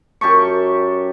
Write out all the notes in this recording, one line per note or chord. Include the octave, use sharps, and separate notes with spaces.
F#2 G4 A5 C#6